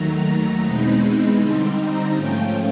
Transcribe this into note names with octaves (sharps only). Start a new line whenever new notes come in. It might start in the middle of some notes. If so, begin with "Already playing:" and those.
Already playing: D#2 D#3 F#3 A3 A#5
E2 B2 G#3 C4 D#4 B5
D3 G3 C4 D#4 C6
A#5
G#2 F3 A3 C#4 F4 G5